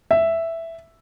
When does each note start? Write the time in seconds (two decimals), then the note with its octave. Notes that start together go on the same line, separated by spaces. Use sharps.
0.11 E5